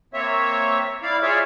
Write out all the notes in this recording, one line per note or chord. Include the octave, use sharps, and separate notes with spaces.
A#3 C4 C#5 E5
E4 D5 F5
F4 G#4 C#5 D5 E5